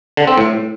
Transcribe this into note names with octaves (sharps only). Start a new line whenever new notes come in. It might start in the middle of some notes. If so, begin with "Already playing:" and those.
D3
C4
A2